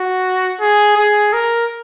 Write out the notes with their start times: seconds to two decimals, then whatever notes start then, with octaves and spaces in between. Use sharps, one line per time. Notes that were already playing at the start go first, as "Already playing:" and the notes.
Already playing: F#4
0.61 G#4
0.97 G#4
1.33 A#4